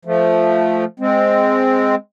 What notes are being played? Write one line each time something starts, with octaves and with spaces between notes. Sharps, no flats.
F3 A3
G#3 C4